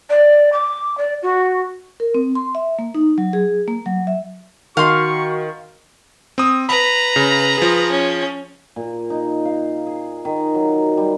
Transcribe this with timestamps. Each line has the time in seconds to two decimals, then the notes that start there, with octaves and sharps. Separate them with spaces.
0.10 D5
0.53 D6
0.98 D5
1.22 F#4
2.00 A#4
2.14 C4
2.35 C6
2.55 E5
2.79 A#3
2.95 D#4
3.18 F#3
3.33 G#4
3.68 A#3
3.86 F#3
4.07 E5
4.77 D#3 F#4 F5 C6 C#6
6.38 C4 D#6
6.69 B4 A#5 B5
7.16 C#3
7.58 F3 G#4
7.91 C#4
8.76 A#2
9.10 D#4
9.45 F5
9.86 G#4
10.25 D#3
10.54 F#3
10.97 G3